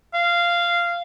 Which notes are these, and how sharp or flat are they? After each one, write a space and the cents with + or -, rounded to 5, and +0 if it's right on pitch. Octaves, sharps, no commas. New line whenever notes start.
F5 -15